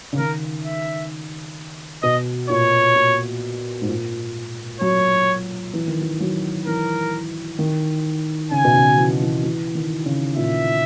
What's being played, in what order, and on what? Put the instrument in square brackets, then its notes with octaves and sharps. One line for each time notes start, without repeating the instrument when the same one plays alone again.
[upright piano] C#3
[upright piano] D#3 [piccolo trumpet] A#4
[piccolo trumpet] E5
[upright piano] B2 [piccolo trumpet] D#5
[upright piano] A#2 [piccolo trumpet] C#5
[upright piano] A#2
G#2
A#2
[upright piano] F#3 [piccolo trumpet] C#5
[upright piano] E3
D#3
E3
F#3
[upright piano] E3 [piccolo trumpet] A#4
[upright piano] D#3
[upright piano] C#3 [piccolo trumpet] G#5
[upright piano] B2
C#3
E3
E3
E3
D#3
C#3
[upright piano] A#2 [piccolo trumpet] E5